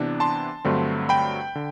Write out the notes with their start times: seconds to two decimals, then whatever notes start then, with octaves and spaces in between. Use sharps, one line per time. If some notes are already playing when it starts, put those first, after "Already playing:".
Already playing: C3 E3 B3 D4
0.20 A5 C6
0.65 G2 D3 F#3 A3 C4
1.09 G5 B5
1.55 D3